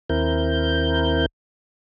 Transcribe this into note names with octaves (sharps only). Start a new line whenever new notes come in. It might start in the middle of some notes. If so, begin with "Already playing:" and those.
D#2 C4 E4 A#4 G6